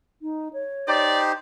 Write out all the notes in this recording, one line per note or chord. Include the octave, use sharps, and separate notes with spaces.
D#4
C#5
D#4 G4 C5 D5